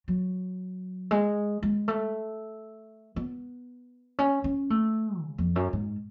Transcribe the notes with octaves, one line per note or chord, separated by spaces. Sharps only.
F#3
G#3
G#3
A3
B3
C#4
C#4
A3
C#3
F2
F#2
G#2